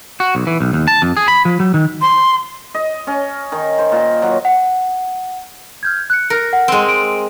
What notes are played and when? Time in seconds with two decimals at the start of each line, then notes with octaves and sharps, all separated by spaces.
0.20 F#4
0.35 B1
0.47 E3
0.60 B1
0.73 D#2
0.88 A5
1.02 F2
1.17 G#4
1.28 B5
1.45 F3
1.60 F#3
1.74 D#3
2.01 C6
2.75 D#5
3.07 C#4
3.52 D#3
3.78 C5
3.92 A#2
4.22 F#3
4.45 F#5
5.83 F6 G6 G#6
6.10 F#6 C#7
6.30 A#4
6.53 F#5
6.68 G#3 C4
6.89 D7